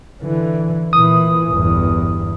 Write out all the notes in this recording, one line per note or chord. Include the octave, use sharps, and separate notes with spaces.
D3 E3
A#2 E3 D#6
G1 E2